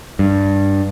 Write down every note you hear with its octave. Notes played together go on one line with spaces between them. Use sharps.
G2